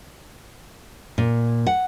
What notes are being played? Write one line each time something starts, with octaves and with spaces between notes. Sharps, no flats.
A#2
F#5